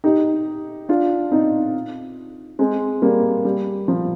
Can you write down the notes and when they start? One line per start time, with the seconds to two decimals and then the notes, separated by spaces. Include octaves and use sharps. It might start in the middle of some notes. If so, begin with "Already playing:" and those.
0.04 D#4 G4
0.89 D4 F4
1.31 C4 D#4
2.59 G#3 C4
3.02 G3 A#3
3.45 G3
3.88 F3